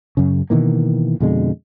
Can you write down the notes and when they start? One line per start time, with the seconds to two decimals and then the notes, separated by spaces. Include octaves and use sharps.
0.17 F#2 C#3
0.50 B2 D#3 E3 A#3
1.20 F2 B2 D3 G#3